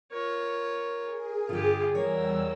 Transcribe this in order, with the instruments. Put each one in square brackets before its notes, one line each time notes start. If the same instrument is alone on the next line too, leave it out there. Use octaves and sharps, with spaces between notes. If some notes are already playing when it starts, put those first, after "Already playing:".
[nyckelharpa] F4 C#5 [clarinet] A#4
[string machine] G#4
[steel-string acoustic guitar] G2 D3 [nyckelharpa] F4 G4
[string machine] E2 G3 E6 [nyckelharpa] A#4 [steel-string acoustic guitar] C#5